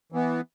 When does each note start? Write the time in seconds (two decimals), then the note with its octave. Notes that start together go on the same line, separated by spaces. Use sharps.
0.12 E3 B3